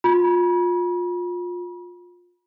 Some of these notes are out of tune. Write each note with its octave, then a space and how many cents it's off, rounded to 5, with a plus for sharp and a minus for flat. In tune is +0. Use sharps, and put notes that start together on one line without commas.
F4 +25 B5 -40